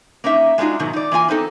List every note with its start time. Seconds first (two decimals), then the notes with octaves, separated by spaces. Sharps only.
0.24 A#3 C#4 D#4 E5
0.58 G#3 A3 D4 D#4 F4 F#4
0.80 G#2 B2 D#3 F#3
0.93 D#4 D5
1.11 E3 A#3 F4 G#5
1.28 B3 C4 D#4 A4